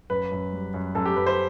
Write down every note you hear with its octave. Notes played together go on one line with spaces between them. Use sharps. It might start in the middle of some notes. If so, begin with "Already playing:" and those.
F#2 B4
F#2
G3
F#2
F#2 A4
G4
F#2 B4
C5